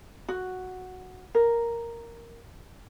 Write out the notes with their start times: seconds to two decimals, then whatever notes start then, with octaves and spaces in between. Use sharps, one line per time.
0.29 F#4
1.35 A#4